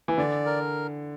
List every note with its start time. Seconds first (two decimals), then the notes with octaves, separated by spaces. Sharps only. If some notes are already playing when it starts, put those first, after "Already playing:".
0.08 E3
0.18 D3 D5
0.46 A#4